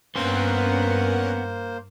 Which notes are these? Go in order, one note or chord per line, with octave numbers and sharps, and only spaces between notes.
G2 A#3 B3 C#4 A#4 C5 F#5 C6